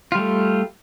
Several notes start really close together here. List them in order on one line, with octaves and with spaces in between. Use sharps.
F4 G3 A3